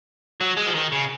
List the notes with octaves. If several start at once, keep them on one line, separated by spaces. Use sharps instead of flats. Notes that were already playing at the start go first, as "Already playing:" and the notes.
F#3
G#3
F3
D#3
C#3